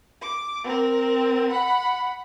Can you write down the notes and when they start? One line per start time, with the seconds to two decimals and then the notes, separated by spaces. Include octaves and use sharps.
0.22 D6
0.64 C4 A#4
1.50 F#5 B5